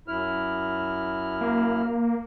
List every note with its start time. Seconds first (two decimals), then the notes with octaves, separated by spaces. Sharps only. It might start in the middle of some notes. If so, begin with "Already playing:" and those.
0.08 F#2 E4 F6
1.41 A#3